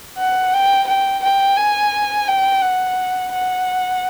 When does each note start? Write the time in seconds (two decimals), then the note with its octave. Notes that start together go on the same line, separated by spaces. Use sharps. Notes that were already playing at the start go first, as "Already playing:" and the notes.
0.18 F#5
0.53 G5
0.87 G5
1.23 G5
1.57 G#5
2.28 G5
2.62 F#5
3.32 F#5